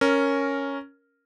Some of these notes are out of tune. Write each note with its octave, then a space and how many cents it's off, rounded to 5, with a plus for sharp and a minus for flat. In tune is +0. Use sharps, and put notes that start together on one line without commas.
C#4 +0 A#4 +0